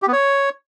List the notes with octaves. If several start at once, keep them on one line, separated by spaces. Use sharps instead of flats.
G4
B3
C#5